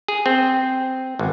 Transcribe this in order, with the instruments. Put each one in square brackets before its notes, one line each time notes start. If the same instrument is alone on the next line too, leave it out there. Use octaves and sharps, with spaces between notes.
[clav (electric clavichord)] G#4
C4
G#1